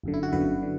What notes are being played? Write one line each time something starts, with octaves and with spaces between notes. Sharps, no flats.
G1 F#2 D3
E4
F#4
G1 F#2 D3 B4
D3